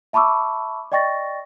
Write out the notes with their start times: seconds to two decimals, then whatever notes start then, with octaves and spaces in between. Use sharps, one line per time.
0.13 E5 A5 B5 C#6 D6 E6
0.92 D5 D#5 G5 C#6 A6 A#6